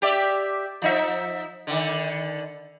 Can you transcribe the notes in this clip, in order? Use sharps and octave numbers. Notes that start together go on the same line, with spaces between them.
G4 D5 E5
F3 D#4 E5
D3 D#3